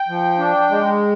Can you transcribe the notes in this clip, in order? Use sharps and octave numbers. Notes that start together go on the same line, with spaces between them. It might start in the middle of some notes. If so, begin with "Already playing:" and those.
Already playing: G5
F3
D4
G#3